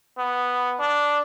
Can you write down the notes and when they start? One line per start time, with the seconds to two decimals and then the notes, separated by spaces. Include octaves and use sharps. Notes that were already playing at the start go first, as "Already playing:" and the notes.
0.18 B3
0.79 D4